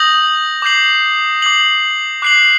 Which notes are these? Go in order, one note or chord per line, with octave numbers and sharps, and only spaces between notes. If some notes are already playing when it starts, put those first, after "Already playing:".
Already playing: D#6 G6 A#6 F#7
D6 G6 C7 F#7
D6 G6 C7 F#7
D6 F#6 C7 F#7